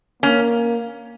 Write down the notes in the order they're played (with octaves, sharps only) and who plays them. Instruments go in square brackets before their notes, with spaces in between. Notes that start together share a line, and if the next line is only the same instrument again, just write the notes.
[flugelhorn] A#3 [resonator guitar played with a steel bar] C#4